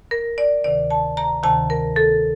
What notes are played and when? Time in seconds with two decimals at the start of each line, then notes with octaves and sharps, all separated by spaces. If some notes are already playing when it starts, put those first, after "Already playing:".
0.11 A#4
0.38 D5
0.64 D2 C3 D#3 D5
0.91 A5
1.17 A#5
1.43 D2 C3 D#3 A5
1.70 A#4
1.96 A4